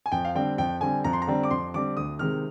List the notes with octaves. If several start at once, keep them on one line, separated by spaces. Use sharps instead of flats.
G#5
F2 G5
F5
D3 G3 C4 G5
F2 G5
D3 G3 C4 G#5
F2 A#5
C6
A#5
D3 G3 C4
D6
F2 C6
D3 G3 C4 D6
D2 D#6
C3 D#3 G#3 F6